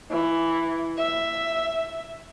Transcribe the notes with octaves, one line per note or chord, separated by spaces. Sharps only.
E3
E5